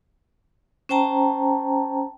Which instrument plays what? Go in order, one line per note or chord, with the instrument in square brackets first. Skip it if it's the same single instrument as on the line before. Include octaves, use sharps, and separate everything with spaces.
[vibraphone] C#4 C5 G5 A5 A#5